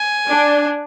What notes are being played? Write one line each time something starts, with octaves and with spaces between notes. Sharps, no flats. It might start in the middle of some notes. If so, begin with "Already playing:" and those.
Already playing: G#5
D4